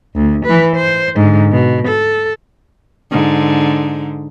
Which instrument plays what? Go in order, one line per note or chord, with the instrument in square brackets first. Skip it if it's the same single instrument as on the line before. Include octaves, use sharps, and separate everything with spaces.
[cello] D2
E3 B4
C5
G#2 D3
B2
A4
[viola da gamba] G#2 D3